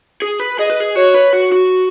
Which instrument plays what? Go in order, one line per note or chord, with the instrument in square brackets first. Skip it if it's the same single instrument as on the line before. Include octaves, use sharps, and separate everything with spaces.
[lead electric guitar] G#4
B4
[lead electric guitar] G#4 [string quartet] D#5
[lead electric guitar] B4
G#4
[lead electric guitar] F#4 [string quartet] C#5
[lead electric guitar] B4
F#4
F#4